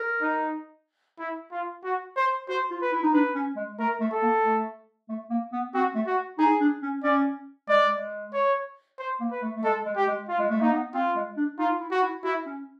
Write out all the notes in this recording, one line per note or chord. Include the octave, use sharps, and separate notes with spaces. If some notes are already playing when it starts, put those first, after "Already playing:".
Already playing: A#4
D#4
E4
F4
F#4
C5
F#4 C5
F4
B4
E4
D#4
D4 B4
C#4
G#3
A3 A#4
A3
A4
A#3
A3
A3
A#3
B3
C4 F#4
A3
F#4
D#4 G#4
D4
C#4
C#4 D5
G#3 D5
G#3
C#5
C5
A#3
B4
A3
A3
G#3 A4
G#3
G4
G#3
F4
G#3
A3
A#3 D#4
B3
C4 F4
G#3
D4
D#4 F4
E4
F#4
E4
E4 F#4
C#4